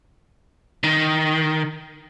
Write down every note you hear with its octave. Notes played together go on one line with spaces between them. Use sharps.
D#3